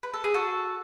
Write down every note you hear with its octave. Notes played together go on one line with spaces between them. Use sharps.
B4
A4
G#4
F#4 A4